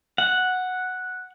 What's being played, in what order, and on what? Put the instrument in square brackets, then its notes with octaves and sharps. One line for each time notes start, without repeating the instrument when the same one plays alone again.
[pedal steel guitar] F#5